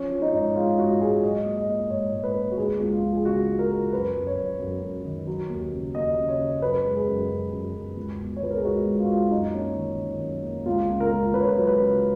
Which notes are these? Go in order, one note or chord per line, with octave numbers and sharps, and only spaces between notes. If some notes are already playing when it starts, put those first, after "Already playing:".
Already playing: F3 C#4
F3
D#4
G#2
G#3 F4
G#2 F#4
G#3 G#4
F#3 D#5
A#3
D#5
A#3
G#2 C#5
G#2
B4
A#3
F#4
C#2 G#4
C#2
F4
F3
G#4
C#3 F#4
G#3
A#4
G#3
F#2 B4
F#2
C#5
F#2
F#2
F#2
D#3
F#3
D#2
C#3
D#2 D#5
C#3
C#5
C#3
F#2 B4
G#3
G#4
F#2
F#2
F#2
F#2
C#2
B2
C#5
C#2 B4
A#4
G#4
G#3 F#4
C#2
F4
F#4
G#3 F4
F#2 D#4
A#3 C#4
D#3
D#3
F#2
A#3
C#2 F4
C#3
A#4
C#2
C#2 B4
C#5
B4
F#3
B4
C#3